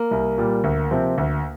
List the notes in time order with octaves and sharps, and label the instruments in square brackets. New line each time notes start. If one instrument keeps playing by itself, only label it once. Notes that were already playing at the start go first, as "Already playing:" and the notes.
Already playing: [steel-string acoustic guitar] A#3
[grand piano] C2
A#2 G3
D2
C3 F3 C4
D2